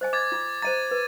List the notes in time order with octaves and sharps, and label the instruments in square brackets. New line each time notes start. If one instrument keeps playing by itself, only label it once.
[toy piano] C5 D#5 G#5
[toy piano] D#5 [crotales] D6 G#6 A6
[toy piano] F4
[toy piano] C5 D#5 A#5 [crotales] A6 D#7
[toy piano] B4